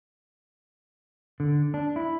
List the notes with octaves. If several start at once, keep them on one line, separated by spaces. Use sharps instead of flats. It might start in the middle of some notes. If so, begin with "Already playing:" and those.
D3
D4
E4